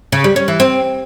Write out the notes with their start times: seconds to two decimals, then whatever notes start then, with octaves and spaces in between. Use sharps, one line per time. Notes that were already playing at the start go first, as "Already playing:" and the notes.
0.12 C#3
0.24 G3
0.36 C#4
0.48 E3
0.60 C4